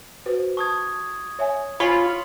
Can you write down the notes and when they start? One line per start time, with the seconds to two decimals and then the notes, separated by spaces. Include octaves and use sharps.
0.26 F#4 B4 C5
0.57 A5 C#6 D#6 G#6
1.39 C#5 E5 G#5
1.80 F4 C#5 G#5 B5